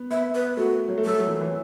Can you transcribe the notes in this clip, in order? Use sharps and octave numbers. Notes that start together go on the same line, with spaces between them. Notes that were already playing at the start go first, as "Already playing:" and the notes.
Already playing: B3
B3 E5
B4
A3 F#4
F#3
A3
F#3 A4
F#3
E3
E3